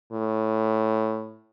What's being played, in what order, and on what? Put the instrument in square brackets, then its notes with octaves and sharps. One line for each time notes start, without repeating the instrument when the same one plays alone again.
[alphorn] A2